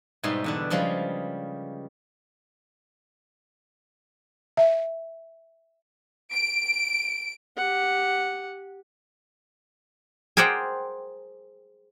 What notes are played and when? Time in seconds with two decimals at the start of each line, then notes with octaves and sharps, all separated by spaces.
0.23 G#2 B2 G3 B3 E5 C6
0.44 E2 D3 D4
0.70 C#3 F3 G3 G#3 F5
4.57 E5
6.33 D7
7.57 G4 F#5
10.37 G#4 A#4 C5 D5 F#5 G5